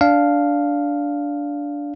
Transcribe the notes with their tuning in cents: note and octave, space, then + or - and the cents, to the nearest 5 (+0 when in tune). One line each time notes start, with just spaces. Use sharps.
D4 -10 F5 +0